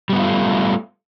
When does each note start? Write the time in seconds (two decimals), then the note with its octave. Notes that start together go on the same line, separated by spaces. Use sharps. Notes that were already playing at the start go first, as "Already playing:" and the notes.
0.10 G3
0.13 B3
0.16 F#4
0.19 F4
0.22 A3